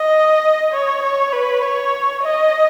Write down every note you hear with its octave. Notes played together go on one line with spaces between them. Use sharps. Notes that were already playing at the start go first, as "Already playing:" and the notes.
Already playing: D#5
C#5
C#5
B4
C#5
D#5